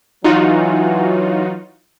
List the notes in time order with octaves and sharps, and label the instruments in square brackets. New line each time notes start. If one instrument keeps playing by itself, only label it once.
[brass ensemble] E3 F#3 [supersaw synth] D#4 F4 F#4